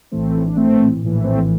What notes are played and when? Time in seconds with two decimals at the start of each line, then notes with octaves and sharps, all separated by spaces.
0.11 A#1 A2 E3 A3 C4
0.46 D4
0.56 A3 C4
1.02 A#1 A2 E3
1.23 A3 C4